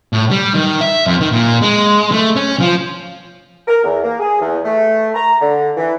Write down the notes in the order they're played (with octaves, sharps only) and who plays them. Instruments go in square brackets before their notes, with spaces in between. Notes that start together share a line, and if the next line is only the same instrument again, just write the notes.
[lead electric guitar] A2
G3
D#3
E5
F2
D#3
A#2
G#3
A3
C#4
F3
[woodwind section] A#4
E2
A#3
G#4
E2
A3
A#5
D3
E3